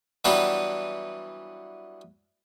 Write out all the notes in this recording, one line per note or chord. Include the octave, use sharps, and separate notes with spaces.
E3 F#3 G3 B3 D4 B4